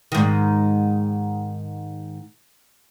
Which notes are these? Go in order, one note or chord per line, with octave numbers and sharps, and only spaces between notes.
G#2 D#3